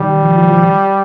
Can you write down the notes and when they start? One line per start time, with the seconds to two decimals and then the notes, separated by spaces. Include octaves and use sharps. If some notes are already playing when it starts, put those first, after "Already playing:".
Already playing: D#3 G3
0.23 F3
0.36 F3
0.50 F3